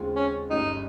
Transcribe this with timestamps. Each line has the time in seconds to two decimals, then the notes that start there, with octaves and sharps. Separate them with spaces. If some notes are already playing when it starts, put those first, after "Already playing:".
Already playing: D#2 C#3 G#3 C4 F4
0.16 C#4
0.50 G1 G2 G3 C#4 D#4